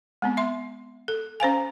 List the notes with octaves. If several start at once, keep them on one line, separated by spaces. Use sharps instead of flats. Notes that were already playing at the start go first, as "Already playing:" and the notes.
G#3 B3 C4
E5 C6
A4
C#4 C5 F5 G#5